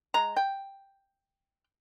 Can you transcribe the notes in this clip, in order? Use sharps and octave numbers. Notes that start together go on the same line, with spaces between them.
G#3 A#5
G5